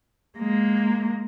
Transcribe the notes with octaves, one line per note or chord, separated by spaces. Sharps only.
G#3 A#3